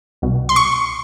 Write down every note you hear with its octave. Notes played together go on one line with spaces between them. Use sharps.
C2 B2
C6
C#6